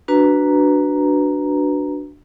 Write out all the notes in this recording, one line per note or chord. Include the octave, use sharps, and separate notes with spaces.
D4 F#4 B4 A#5